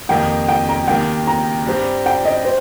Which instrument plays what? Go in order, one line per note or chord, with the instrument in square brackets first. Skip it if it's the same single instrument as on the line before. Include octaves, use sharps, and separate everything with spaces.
[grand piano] F2 D#3 A#3 G4 [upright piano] G5
[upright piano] G5
A#5
[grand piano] D#2 D#3 A#3 G4 [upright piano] G5
[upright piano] A#5
[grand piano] G2 G3 C4 G4
[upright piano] G5
D#5
C5